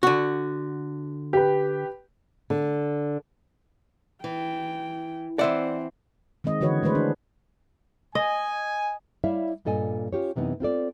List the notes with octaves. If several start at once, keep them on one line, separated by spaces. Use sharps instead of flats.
D3 F#4
G4 B4
D3
E3 G5
E3 C4 C5 D5 E5 F#5
D#3 G#3 C4 D#5
D3 E3 F#4 B4 C#5
E3 G#3 A3 B4 C5
D4
D#5 G#5
G3 E4 C#5 D5 E5 F5
G2 A#2 A4 D#5 G#5
C#4 F4 G4 C#5
F#2 C3 E3 B3 D#4
C4 F4 A4 D5